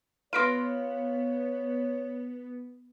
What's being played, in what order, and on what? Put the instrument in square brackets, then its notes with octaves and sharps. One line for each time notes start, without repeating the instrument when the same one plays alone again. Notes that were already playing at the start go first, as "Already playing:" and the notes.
[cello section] B3 [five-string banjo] F4 B4 F5 [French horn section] C#5 [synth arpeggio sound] C6 A#6 D7